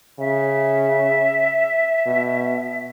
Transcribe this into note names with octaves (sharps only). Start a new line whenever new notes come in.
C#3 E5
B2